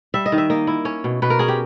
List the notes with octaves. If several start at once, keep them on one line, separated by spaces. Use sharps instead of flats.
G3 E5
D#5
D#3
E5
A#3 D#5
E4
C#4 C#5
B2
B2 B4
A#4
C#4 G#4
G4